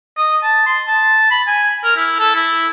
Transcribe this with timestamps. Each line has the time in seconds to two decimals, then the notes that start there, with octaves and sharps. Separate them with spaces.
0.17 D#5
0.43 A5
0.67 C6
0.88 A5
1.31 B5
1.47 G#5
1.84 A#4
1.96 E4
2.19 A4
2.35 E4